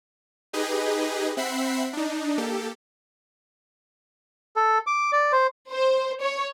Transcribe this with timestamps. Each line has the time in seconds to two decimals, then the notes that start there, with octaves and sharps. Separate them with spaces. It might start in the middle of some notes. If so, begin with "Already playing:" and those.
0.53 D#4 G4 G#4 B4 D#5
1.37 C4 E5 F#5 B5 C7
1.93 D4 D#4
2.38 A#3 G4 A4
4.56 A4
4.87 D6
5.12 D5
5.32 C5
5.70 C5
6.20 C#5